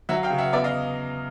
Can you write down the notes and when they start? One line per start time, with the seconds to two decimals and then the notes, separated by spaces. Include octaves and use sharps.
0.09 F#3 E5 F#5
0.23 F5 G5
0.30 C#3
0.38 E5 F#5
0.53 E2 D5 E5
0.64 D#5 F5